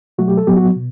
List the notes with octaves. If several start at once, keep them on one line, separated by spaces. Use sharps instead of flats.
B2 F#3 A3 F#4
G4
A4
A2 F#3 B3 G4
F#4
B2